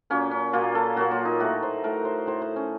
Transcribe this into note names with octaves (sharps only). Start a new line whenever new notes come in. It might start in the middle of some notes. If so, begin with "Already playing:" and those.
A#2 F#3 A#3 C#4
C#4
A#2 F#3 A#3 F4
A4
A#2 F#3 A#3 F#4
F4
D#4
A2 A3 F#4
C5
A2 A3 A#4
C5
A2 A3 C5
C5
C#4